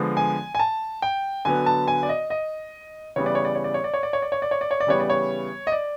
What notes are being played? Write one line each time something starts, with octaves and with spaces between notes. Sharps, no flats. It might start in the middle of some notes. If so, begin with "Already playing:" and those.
Already playing: D3 F3 G#3 B3
G#5
G#5
A5
G5
D3 F#3 B3 G#5
A5
G#5
D5
D#5
D#5
C#3 E3 G3 B3 C#5
D5
C#5
D5
C#5
D5
C#5
D5
C#5
D5
C#5
D5
C#5
D5
C#5
D5
C#5
D5
C#3 E3 G3 B3 C#5
D5
C#5
D#5
D5